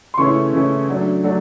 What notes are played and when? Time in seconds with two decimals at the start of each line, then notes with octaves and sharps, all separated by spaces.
0.14 C6
0.18 C#3 E3 A3 C#4 E4 C#6
0.53 C#3 E3 A3 C#4 E4
0.88 F#3 A3 D4
1.24 F#3 A3 D4